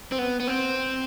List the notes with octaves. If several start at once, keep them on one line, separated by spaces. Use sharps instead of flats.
C4
B3
B3
C4